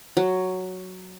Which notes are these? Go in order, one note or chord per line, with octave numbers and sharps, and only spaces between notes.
F#3